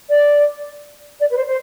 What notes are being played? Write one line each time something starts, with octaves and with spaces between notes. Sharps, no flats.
D5
D5
B4
C5
C5